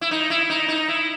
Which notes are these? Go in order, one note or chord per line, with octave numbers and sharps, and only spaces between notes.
E4
D#4
E4
D#4
D#4
E4